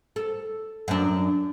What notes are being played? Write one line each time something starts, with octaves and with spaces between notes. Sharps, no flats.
A4
F#2 D4